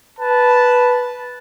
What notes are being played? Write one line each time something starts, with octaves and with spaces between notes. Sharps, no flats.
B4 A5